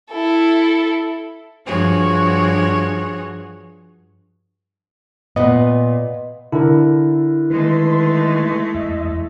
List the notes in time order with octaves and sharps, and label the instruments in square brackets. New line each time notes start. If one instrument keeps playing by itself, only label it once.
[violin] E4 A4
[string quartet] G2 F3 F#4 G#4 C#5
[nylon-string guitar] A#2 B3 [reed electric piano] B4 D#5
[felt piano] D3 A4 A#4 [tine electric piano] E4
[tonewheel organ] D#3 B4 C6 [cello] G#3 A3
[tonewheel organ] E2 D#5 E5